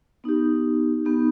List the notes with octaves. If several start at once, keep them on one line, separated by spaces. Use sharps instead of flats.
B3 D#4 G4
B3 D#4 G4